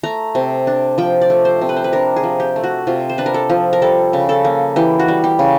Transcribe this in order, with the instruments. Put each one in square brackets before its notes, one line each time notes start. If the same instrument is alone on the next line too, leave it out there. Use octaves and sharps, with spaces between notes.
[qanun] A3 A#5
C3
D4
F3 G5
D5
A3
C5
C3
B4
C5
B4
D4 A#4
G#4
F3
G4
A3
F#4
C3 F4
C5
D4 B4
A#4
A4
F3
A#4
G3 A4
C#3
A4
A#3
E3 G4
F#4
G3
G4
C#3